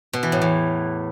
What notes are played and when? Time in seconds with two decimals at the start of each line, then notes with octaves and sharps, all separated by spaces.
0.13 B2
0.23 E3
0.32 A2
0.42 E2